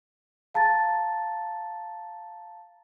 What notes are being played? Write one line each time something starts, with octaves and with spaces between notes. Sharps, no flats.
F5 A5 A#5 A6